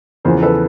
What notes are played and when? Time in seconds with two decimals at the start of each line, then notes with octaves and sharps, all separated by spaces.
0.24 E2 C#3 F3 A#4 C5
0.42 A4 B4